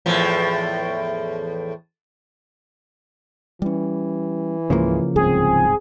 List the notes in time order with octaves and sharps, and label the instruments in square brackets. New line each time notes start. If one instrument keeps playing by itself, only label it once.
[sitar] E2 A2 F3
[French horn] E3 [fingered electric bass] G3 C#4
[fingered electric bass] C#2 G#2 G#3 [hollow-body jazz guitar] C#3 F3 A#3
[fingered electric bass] D1 C2 G#2 [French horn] C4 [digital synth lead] G#4